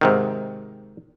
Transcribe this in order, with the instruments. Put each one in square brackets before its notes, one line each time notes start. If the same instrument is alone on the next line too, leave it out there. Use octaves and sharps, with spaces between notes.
[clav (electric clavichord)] G#2 C3 D#3